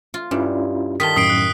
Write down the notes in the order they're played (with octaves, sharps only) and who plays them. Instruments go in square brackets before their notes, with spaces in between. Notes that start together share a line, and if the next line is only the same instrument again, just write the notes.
[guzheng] F4
[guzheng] G2 [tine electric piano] C#4 E4 F4
[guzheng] D#3 F4 [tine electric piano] A5 D#6 [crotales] B6 G7
[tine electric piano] F#2 A2 [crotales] D#6 C7 D7
[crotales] F#6